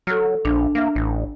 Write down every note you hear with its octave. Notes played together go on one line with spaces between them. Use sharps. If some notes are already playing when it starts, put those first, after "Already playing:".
F#3 A4 F6
A#1 D4
A#3 D4 E5
A1